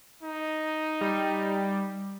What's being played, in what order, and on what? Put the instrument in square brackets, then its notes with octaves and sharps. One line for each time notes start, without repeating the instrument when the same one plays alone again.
[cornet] D#4
[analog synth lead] G3